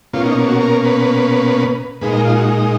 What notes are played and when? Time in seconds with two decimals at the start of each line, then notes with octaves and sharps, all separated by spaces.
0.13 B2 A#3 C#4 F4
0.25 D#4
0.48 F#4
0.61 A#4
0.84 B4
2.01 A#2 G#3 D#4 B4
2.13 A#4
2.25 F4
2.36 F#4